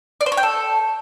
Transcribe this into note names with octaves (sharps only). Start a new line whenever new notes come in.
D5
C5
C#5
G5
A4